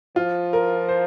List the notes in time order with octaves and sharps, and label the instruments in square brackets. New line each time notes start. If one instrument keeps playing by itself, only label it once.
[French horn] F3 [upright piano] F4
[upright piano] A#4
C5